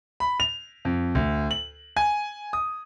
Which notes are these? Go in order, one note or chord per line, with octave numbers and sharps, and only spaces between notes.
B5
F7
F2
D2
F#7
G#5
D#6